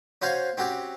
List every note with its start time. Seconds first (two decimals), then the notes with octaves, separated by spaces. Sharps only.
0.22 C#4 F#4 C5 F5 G#5
0.57 C4 C#4 F#4 G4